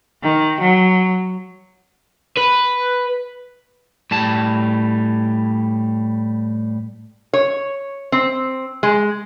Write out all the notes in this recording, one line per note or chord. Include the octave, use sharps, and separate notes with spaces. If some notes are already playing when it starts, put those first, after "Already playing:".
D#3
F#3
B4
A2 G3 A5
C#5
C4
G#3